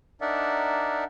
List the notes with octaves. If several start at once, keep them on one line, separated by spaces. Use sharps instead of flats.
D4 D#4 A#4 D5 E5 F#5